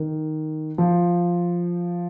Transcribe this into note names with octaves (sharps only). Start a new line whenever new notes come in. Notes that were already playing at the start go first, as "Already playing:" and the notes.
Already playing: D#3
F3